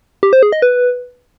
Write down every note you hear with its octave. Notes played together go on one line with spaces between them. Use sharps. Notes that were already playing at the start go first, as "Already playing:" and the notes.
G4
C5
G#4
D#5
B4